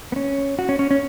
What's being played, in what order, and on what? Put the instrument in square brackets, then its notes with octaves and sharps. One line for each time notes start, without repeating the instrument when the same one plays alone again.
[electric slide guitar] B3
C#4
F#4
C#4
C#4
C#4